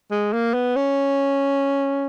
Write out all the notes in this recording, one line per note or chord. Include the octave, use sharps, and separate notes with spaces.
G#3
A#3
B3
C#4